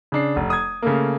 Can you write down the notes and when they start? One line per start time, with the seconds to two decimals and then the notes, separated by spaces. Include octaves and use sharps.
0.12 C#3 D4 C7
0.36 F1
0.50 D#6 G#6
0.82 C#3 A3 A#3